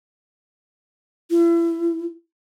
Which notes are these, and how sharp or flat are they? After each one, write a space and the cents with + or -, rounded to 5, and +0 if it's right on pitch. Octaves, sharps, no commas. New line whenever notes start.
E4 +35